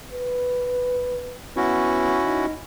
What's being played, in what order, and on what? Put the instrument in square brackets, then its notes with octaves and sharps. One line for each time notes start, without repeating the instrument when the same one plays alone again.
[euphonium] B4
[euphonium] B3 [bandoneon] C#4 E4 F#4
[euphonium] D#4